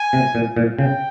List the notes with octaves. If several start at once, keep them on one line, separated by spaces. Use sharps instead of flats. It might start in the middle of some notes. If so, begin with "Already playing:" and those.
Already playing: G#5
C3
A#2
A#2
C#3 G5